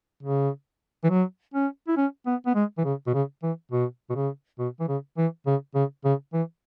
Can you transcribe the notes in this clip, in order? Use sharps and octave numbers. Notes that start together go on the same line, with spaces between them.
C#3
E3
F#3
C#4
E4
C#4
B3
B3
G#3
E3
C#3
B2
C#3
E3
B2
B2
C#3
B2
E3
C#3
E3
C#3
C#3
C#3
E3